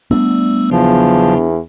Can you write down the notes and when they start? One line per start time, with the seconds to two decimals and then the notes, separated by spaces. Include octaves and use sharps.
0.11 G3 A3 B3 D4 E6
0.71 E2 C#3 F3 F#3